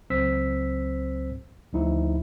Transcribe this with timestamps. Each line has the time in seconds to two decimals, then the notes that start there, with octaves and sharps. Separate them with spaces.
0.10 C#2 F#3 C4 C5 E6 B6
1.73 D2 F3 D#4 E4